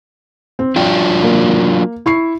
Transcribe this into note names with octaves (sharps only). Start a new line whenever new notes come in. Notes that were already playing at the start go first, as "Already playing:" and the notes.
C4
F#3 D4 F4 G5
A#3
E4 C#6 C7